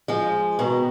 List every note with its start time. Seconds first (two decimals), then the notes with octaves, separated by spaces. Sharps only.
0.08 F3 G#3
0.59 B2 D#3